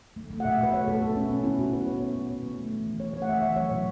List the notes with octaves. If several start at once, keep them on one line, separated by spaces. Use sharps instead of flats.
A3
A3
F#5
B2 E5
B2 B4
A3 C#5
A3 A4
B2 A4
B2 C#4
B3 C#4
B3 E4
B2 F#4
B2 B4
B3 C#5
B3
B2
B2
A3
A3
E3
E3
A3 C#5
A3 C#5
F#5
E3 E5
E3 E5
F#3 C#5
B2